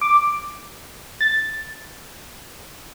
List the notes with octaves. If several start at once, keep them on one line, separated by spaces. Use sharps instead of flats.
D6
A6